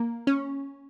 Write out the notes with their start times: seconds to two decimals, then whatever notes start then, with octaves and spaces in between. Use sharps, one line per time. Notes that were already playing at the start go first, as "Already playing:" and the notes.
Already playing: A#3
0.27 C#4